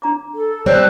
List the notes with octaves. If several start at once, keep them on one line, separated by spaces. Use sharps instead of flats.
D4 A#5 D6
A4
G3 C4 C#5 A5 E6 F#6